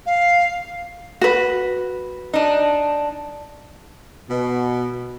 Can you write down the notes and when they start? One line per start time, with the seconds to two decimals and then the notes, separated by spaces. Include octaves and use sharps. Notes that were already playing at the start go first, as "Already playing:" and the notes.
0.06 F5
1.21 F#4 B4
2.34 D4 D#4
4.30 B2